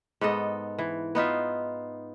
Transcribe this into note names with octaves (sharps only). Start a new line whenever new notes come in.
G#2 B3 A4 D#5
E3
B3 D#4 F4 E5